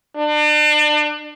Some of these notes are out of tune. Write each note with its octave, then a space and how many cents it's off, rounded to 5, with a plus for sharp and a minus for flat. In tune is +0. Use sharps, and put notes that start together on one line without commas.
D4 +35